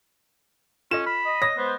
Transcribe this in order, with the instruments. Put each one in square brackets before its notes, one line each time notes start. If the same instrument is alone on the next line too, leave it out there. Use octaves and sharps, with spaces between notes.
[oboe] C#4 [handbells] F4 A4 D#5 [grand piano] E7
[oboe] B5 [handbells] F6
[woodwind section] D#5
[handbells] C#5 D#6 [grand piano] A#6
[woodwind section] G#3 B4 C5 [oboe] B3